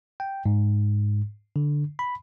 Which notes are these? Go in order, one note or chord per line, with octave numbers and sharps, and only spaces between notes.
G5
G#2
D3
B5